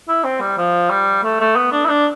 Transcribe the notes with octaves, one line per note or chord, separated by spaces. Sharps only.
E4
C4
G3
F3
G3
A3
A3
B3
D4
E4
D4